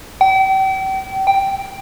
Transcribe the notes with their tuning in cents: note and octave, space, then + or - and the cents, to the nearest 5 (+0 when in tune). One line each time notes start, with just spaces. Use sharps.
G5 -35
G5 +0